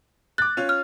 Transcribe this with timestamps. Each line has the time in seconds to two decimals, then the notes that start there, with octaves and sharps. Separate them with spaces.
0.38 D6 F#6 A6
0.57 C#4 F4
0.69 F6